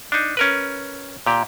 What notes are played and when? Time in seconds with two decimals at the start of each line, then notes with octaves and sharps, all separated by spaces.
0.12 D4 D#4
0.37 C#4 A#4 B4
1.26 A#2 G4